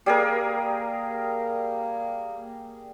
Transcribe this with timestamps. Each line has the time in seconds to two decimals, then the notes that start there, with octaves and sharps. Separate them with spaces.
0.06 G3 A#3 G#4 A#4